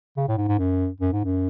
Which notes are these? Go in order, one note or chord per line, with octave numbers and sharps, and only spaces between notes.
C#3
A2
G#2
G#2
F#2
F#2
G#2
F#2